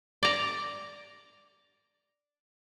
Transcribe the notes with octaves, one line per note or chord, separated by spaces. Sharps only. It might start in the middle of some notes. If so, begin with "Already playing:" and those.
D5 A#5